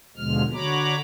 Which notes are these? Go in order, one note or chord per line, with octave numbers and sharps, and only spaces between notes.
D#2 B2 D3 F3 G#3 F6
D3 F#4 C#5 A#5 B5 D6